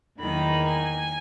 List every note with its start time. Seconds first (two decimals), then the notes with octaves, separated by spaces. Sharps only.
0.20 E2 D#3 F#3 A#3 D#4 B5
0.68 G#5